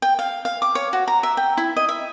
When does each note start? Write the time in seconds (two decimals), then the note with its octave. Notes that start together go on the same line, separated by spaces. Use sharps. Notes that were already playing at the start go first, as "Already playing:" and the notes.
0.02 G5
0.19 F5
0.45 F5
0.62 D6
0.75 C#5
0.93 F#4
1.08 A#5
1.23 E5
1.37 G5
1.57 E4
1.76 D#5
1.89 E5